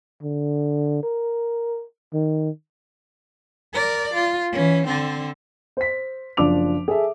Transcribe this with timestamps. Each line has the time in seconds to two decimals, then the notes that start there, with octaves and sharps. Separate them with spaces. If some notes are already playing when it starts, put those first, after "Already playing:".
0.23 D3
1.03 A#4
2.13 D#3
3.73 A#4 D5
4.14 F4
4.52 E3 C#4
4.86 D3 C4
5.77 C5 B6
6.37 F#1 F3 D4 D6 F7
6.88 G#4 A4 E5